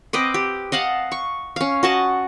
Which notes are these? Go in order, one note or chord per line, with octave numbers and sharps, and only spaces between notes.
C4 B4 D#5 D6
G4
D#5 F5 F#5 A5
C#6
C#4 F5
F#4 D#5 A5